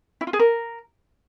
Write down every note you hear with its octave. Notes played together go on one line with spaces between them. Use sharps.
E4
F4
G#4
A#4